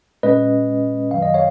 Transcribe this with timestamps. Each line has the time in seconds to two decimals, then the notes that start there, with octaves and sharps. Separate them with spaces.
0.23 A#2 G#3 C#4 B4 D#5
1.11 F#2 D#3 F#3 F5
1.22 D#5
1.34 C#5 F5